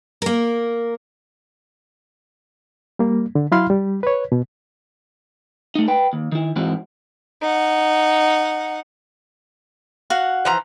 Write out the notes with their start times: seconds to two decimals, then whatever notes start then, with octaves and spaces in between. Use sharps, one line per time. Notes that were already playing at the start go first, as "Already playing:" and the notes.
0.22 A#3 A#4
2.99 G3 A#3
3.35 D3
3.52 F#3 E4 F5 B5 C6 F6
3.70 G3
4.03 B4 C#5
4.32 B2
5.75 A3 D#4
5.88 B4 G5
6.13 D#2
6.32 D#3 E4
6.56 G#2 E3 C4 F#4
7.42 D#4 F#5
10.10 F#4 F5 F#5
10.45 E3 F3 A#5